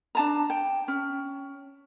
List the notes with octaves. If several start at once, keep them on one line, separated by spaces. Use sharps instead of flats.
D4 A5 A#5
G5
C#4